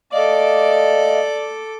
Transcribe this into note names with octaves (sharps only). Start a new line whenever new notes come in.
A3 A4 D5 D#5 F5 D6